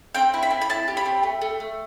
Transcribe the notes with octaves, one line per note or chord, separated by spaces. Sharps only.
C4 G5
E4
B5
C4
B5
E4 A5
G4
B5
C4
A3
A3
A3